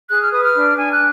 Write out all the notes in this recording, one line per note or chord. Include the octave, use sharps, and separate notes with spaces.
G#4 F#6
F6
B4 D#6
F6
D4
D4 G#5
F#6